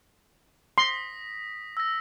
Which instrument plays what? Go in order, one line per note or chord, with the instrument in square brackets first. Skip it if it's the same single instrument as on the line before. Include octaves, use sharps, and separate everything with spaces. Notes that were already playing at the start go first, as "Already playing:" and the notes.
[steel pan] C6 [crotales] D#6 A#6 B6
[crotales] E6 A#6